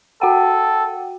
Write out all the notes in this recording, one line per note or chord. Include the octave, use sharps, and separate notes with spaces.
F#4 A4 F#5 G5